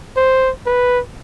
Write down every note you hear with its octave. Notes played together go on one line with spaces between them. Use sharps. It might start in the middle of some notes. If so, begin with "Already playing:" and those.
C5
B4